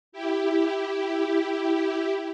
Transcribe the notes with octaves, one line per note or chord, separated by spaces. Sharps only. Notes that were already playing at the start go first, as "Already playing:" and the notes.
E4 G4